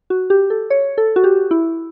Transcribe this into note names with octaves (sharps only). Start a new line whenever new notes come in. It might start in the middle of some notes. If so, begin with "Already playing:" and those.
F#4
G4
A4
C#5
A4
F#4
G4
E4